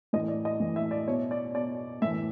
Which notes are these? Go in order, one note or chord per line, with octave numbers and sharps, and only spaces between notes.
A2 E3 D#5
D5
D#5
A2 E3
E5
D5
B2 C#5
D5
B2 D5
A2 E3 E5